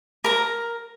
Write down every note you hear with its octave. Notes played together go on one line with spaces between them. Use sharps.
A#4 A#5